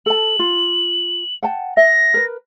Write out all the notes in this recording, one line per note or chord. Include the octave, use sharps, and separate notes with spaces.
A4 A5 F#7
F4
F#5 G5 A5
E5 A#6
A#4 B4